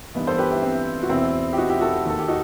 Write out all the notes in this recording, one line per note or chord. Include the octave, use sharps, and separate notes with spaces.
G2 E3 B3 D#4
A4 C5
G4 B4
E4 G4
C4 E4
F#4
E2 B2 C4 E4
G4
D#4 F#4
E4 G4
F#4 A4
D#2 D#3 A4
G4
D#4 F#4